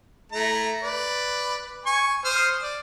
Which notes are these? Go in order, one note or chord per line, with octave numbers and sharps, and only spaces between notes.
A3 E4 A#5
B4 D5
G#5 C#6
C5 D#6 F6
D5